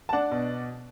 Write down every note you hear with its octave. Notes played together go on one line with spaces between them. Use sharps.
A5
D4 D5 F#5
B2